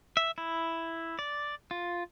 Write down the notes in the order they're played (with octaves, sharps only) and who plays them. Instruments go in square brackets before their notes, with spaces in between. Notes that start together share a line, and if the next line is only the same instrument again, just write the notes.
[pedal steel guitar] E5
E4
D5
F4